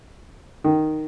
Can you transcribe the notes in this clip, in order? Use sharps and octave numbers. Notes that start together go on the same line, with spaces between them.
D#3